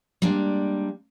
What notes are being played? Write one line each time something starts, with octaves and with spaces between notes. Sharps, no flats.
G3 G#3 A#3 D4